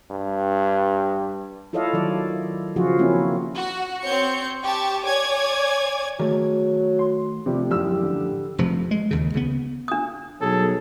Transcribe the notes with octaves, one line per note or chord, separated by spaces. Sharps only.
G2
E4 F4 A4 C#5 D#5 F5
D#3 F#3 D5
C#3 F3 F4 F#4 G#4
A#3 C4 C#4 E4
F#4
C4 C#5 G6 C#7
G4 A5 C#6
C#5 D5 G#5 D6 G#6
D#3 F#3 A3 G#4
C6
C3 F3 G3 A3
D1 F#2 A2 F3 G3 E6
D3
F1 C3 F3
G#3
D#2 C#3
C#2 C#3 B3
D4 D#6
B1 F#3 G3 G#4 A4